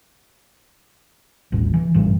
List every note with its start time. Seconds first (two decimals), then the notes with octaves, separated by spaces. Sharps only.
1.52 D#1 A1
1.74 E3
1.94 A1 G2 E3